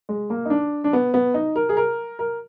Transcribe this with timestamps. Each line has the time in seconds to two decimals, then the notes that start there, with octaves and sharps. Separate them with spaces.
0.09 G#3
0.30 A#3
0.45 D#4
0.50 D4
0.84 D4
0.93 B3
1.14 B3
1.34 D#4
1.56 A#4
1.69 G#4
1.77 A#4
2.19 A#4